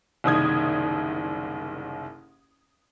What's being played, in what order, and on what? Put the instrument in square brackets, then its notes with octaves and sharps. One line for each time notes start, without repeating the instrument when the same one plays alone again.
[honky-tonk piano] F#1 C2 D#3 D#6 G#6